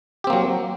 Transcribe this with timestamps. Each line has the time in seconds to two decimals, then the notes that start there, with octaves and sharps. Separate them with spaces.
0.24 G4
0.27 C4
0.30 A#3
0.33 F#3